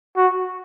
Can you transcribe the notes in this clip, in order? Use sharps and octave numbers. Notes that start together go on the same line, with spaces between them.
F#4